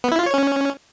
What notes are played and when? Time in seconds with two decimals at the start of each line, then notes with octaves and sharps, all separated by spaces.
0.04 B3
0.11 E4
0.19 F4
0.26 C#5
0.34 C#4